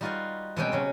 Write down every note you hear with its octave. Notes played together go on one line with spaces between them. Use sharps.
G3 D#4 F4 F#4 B4 F5
B2 G3 G#3 C4 C#4 G5
C#3 F#3 C#4